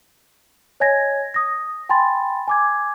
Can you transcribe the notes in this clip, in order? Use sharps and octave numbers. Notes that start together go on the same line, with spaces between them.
C#5 D#5 G#5 G#6 A#6
D#6 A#6
G5 G#5 B5 C6 A6
G#5 D6 G#6